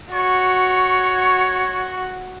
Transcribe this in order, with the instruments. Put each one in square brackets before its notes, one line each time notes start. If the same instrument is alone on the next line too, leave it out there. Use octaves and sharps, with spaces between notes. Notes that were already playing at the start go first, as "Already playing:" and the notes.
[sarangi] F#4 [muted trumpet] C#5 [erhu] C#6